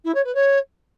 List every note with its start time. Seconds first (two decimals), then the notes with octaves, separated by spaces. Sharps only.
0.04 E4
0.14 C#5
0.24 B4
0.34 C#5